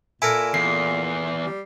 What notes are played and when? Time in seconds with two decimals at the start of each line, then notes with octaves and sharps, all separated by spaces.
0.22 A#2 E4 A4 A#4 G#5
0.54 E2 C7
1.44 G3